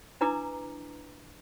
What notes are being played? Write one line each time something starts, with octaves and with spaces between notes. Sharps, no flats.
D4 E4 B4 A#5 D6 D#6